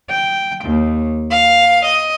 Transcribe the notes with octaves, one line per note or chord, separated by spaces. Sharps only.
G5
D#2
F5
D#5